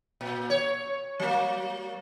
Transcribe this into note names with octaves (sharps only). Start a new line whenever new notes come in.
A#2
C#5
F#3 A#3